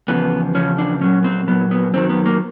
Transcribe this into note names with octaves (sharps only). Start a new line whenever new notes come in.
E2 C#3 F3 B3
E2 C#3 F3 C#4
D4
A#2 F#3 C#4
C4
A#2 F#3 B3
B3
F#2 D#3 F#3 C4
B3
A#3